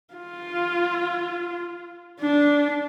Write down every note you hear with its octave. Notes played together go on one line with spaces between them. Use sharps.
F4
D4